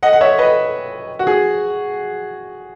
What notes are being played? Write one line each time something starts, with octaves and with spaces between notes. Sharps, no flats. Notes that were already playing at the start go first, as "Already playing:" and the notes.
D#5 F#5
F#5
C#5 E5
B4 D#5
F#4
G#4